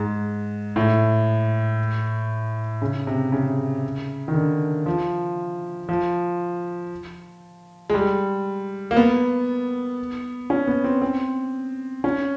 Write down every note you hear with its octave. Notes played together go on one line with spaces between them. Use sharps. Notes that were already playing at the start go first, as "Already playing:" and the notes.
Already playing: G#2
A2
C#3
C3
C#3
D#3
D3
F3
F3
G#3
G3
A#3
B3
C#4
B3
C4
C4
C#4